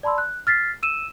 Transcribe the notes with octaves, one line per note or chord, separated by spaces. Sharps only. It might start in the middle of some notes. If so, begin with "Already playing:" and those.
D5 A5 B5 C6 E6
F#6
F6 A6 B6 C7
E6 D#7 E7